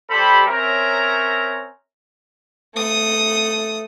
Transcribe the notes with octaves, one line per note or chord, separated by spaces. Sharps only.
G3 G4 A4 C5 B5
C4 C#4 A#4 C#5 E5 A#5
A3 D#6